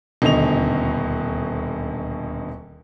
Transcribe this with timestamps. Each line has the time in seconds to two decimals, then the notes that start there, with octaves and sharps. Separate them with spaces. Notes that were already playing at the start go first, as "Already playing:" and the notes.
0.22 D#1 D2 B2 D#5 F7